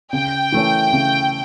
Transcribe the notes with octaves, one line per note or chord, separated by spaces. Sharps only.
C#3 G5
E3 A3 C#4
C#3